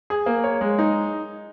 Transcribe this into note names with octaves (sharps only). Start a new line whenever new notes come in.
G#4
A#3
C#5
G#3
D#4